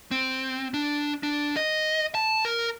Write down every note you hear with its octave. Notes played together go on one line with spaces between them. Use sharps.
C4
D4
D4
D#5
A5
A#4